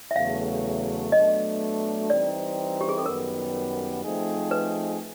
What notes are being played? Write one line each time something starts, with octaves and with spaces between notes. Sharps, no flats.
E5
E2 C#3 F#3 A3 F5
B2 F#3 A3 D4 D#5
E3 G3 C4 D#4 D5
G4
G#4
A4
F#2 D#3 G3 B3 A#4
F3 A3 C4 D#4 G#4
B4